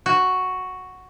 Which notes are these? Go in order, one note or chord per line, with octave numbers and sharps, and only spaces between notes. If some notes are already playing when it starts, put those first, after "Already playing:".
F#4